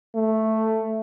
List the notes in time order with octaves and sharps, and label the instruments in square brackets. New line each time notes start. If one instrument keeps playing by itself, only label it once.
[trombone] A3